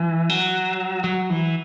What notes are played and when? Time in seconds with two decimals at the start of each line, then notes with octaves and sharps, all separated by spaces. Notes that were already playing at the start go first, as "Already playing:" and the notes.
Already playing: E3
0.30 F#3
1.04 F#3
1.30 E3